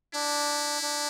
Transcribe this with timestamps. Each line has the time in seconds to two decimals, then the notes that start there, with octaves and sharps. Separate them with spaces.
0.14 D4 E4
0.82 D4